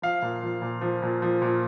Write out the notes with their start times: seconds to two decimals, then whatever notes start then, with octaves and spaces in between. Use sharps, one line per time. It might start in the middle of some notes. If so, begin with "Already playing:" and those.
0.02 F3 F5
0.22 A#2
0.42 F3
0.62 A#2
0.81 F3
1.02 A#2
1.22 F3
1.42 A#2